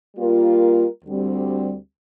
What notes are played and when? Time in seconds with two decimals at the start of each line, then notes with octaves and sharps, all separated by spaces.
0.15 G3 A#3 F4 A#4
1.05 D2 D3 G3 C4